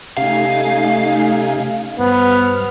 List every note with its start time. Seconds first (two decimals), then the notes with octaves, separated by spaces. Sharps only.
0.17 C3 A3 C#4 D#4 G4 F5 G#5
1.99 G2 G3 B3 C5 F6